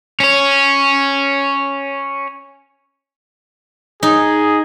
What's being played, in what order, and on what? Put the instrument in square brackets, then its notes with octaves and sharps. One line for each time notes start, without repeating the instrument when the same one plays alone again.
[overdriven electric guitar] C#4 C#5
[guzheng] D#4 [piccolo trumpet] G#4